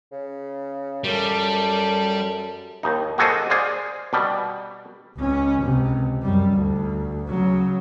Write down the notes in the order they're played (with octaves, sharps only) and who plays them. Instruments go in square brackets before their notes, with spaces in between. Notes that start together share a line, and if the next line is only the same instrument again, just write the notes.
[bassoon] C#3
[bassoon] F#2 [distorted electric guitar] G3 [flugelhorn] A4
[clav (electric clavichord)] D#2 D#4
A#3 F#4 G#4 A4 C5 D#5
G#4 C5 D5 F5
B2 G3
[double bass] C#2 C#4
C#2 C3
F#2 G3
D2
C#3 F#3